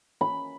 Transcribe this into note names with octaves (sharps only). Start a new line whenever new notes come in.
B5